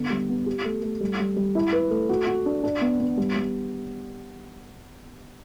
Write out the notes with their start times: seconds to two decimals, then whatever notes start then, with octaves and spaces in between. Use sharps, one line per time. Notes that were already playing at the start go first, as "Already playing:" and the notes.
Already playing: D3 B3
0.10 G3
0.29 B3
0.46 G4
0.65 A3
0.82 A3
1.01 G3
1.20 G3
1.36 G3
1.55 E4
1.73 B4
1.91 A3
2.09 F#4
2.27 F#4
2.46 D4
2.63 D4
2.81 B3
3.00 B3
3.17 G3
3.36 G3